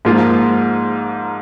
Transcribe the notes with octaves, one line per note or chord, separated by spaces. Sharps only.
G#2 F3 A#3 F4